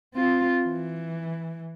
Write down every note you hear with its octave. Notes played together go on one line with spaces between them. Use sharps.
C4 F4
E3